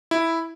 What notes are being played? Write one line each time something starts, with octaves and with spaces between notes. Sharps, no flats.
E4